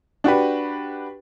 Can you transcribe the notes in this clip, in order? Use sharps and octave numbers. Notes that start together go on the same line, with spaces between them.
D4 F#4 G4 B4